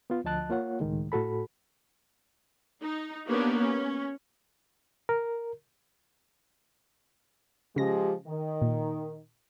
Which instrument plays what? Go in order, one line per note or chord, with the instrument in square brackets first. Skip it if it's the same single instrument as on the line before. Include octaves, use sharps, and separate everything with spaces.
[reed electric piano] B3 F4
D2 F3 D#5 A5 F#6
A#3 F4 C#5 F#5
C#2 A2 D#3 G#3
A2 F#4 A4 B5
[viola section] D#4
A#3 B3 D4 G4 B4 C#5
C#4
[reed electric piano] A#4
[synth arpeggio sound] C#3 A#6 [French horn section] F3 G#3 G4
[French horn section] D#3
[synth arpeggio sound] A#2